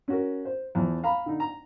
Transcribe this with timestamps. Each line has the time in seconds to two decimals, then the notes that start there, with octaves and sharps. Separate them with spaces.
0.08 C#4 F#4 A#4
0.45 C5
0.75 E2 F3
1.04 F5 A#5 B5
1.26 D3 D#4
1.40 A#5